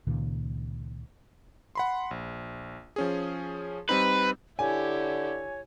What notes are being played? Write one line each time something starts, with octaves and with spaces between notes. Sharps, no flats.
C#2 A#2 D#3
F#5 B5 C6
A#1
F3 C#4 G#4
G3 C4 D#4 B4
D3 E4 G4 C#5 G#5